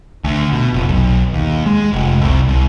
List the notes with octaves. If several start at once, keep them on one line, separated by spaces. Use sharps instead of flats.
D2
B2
F1
B1
D#2
G#3
F1
C2
C2